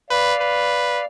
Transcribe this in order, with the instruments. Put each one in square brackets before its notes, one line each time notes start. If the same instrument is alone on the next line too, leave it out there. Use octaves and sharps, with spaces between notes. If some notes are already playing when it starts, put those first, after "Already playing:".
[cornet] B4 [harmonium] D5 F5
[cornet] B4